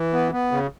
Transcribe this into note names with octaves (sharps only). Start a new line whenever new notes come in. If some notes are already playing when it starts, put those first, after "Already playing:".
Already playing: E3
B3
B3
C#3